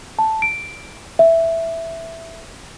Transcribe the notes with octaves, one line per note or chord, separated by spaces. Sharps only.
A5
D7
E5